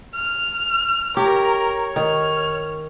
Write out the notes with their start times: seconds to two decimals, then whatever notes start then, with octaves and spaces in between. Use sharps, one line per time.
0.15 F6
1.17 G4 A#4 C#5
1.96 D#3 F6